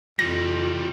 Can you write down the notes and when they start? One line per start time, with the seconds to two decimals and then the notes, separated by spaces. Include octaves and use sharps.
0.19 F2 E3 G3 F4 A#6